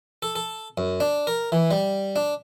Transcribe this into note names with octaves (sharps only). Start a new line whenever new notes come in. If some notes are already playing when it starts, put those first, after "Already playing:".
A4
A4
F#2
D4
A#4
E3
G3
D4